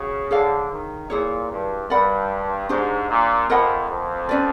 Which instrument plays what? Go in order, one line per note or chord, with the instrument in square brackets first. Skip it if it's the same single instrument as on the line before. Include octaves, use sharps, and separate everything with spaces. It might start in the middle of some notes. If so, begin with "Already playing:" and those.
Already playing: [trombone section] C#3 [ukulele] F#4
[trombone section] D3 [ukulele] G#4 C#5 F5
[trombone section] D#3
[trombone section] A#2 [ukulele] E4 G#4 C#5
[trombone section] G2
[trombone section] G2 [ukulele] A#4 D5 F#5 B5
[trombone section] G#2 [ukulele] D4 G4 C5
[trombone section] A#2
[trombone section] F2 [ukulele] A#4 D#5 F#5 B5
[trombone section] F2
[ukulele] C#4 F#4 B4 D5